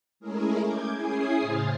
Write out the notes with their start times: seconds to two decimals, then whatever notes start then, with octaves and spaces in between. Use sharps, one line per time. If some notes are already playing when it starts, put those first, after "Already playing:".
0.20 G#3 A3 C#4 E4 G#4 A#4
0.63 D6 G6 G#6
0.96 C#4 E4 G#4 G#5 D#6 C7
1.40 A2 C#3 G#4 C5 F6 A6